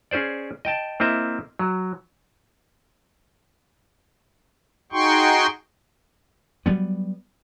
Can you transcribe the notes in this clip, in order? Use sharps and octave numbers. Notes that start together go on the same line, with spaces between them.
C#4 G#4 C5 D5
D#5 G5 A5
A#3 C4 E4 D#5 E5
F#3
D#4 F#4 G#4 G5 C6 C#6
F#3 G3 B3